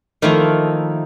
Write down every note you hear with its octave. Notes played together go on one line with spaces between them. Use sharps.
D#3 F3 A3 A#3 E4